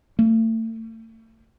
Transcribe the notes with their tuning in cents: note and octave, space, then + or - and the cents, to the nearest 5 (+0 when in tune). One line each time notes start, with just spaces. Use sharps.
A3 +35